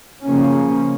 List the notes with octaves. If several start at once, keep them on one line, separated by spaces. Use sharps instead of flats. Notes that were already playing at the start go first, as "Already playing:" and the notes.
C#3 F3 A#3 C#4